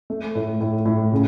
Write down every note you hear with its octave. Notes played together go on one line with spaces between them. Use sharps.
A3
A2
A2
A2
C#3